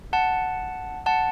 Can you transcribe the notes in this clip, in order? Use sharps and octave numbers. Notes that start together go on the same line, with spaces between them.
F#5 A5
F#5 A5